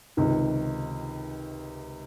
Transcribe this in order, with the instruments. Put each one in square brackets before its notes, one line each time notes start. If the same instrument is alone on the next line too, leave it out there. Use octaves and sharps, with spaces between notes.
[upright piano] C#2 C3 D#3 D#4